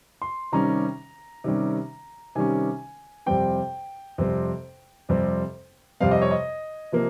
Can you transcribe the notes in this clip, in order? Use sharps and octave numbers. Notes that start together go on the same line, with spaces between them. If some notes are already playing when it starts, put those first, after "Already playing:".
C6
C3 D#3 G3 C#4 A#5
C3 D#3 G3 C#4
C3 D#3 G3 C#4 G#5
F2 C3 G3 C4 G5
F2 C3 G3 C4
F2 C3 G3 C4
F2 C3 G3 C4 F5
D#5
C#5
D#5
C3 F3 A#3